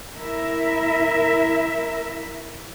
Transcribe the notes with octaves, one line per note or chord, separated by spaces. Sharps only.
E4 A#4 E5